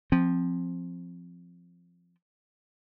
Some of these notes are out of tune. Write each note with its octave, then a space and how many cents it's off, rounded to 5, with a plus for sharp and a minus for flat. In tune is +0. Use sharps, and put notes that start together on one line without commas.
F3 +0 C4 +0